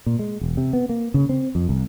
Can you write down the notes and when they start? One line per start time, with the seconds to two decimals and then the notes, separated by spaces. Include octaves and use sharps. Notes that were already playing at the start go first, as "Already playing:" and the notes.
0.06 A#2
0.19 G#3
0.41 E1
0.57 C3
0.73 B3
0.89 A#3
1.14 C#3
1.29 C4
1.55 F2
1.69 C2